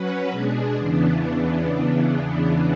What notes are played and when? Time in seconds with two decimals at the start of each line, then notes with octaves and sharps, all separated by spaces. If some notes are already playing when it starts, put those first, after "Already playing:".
Already playing: F#3 C#4 F#4 B4
0.31 B2 G#3 D4 G#4
0.77 E2 C#3 E3 B3 D4